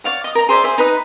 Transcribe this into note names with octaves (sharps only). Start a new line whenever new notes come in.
C#5 D5 F5 F#5
D#5 D#6
A#4 A#5
G#4 C5 D5 E5
G#4 C5 E5
D#4 B4 D#5